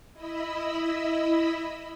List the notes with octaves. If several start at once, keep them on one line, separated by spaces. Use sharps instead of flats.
E4 D#5 B5 E6